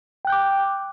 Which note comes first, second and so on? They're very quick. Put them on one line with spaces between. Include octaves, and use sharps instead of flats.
G5 F#6 G6 D6